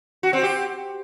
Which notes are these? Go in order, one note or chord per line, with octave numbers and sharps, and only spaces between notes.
F#4
C4
G4